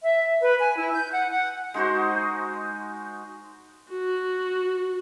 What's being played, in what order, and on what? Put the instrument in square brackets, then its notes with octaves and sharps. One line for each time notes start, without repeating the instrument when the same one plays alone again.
[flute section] E5
B4
G#5
E4
G6
F#5
F#5
[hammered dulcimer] G#3 D#4 F#4 C5
[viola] F#4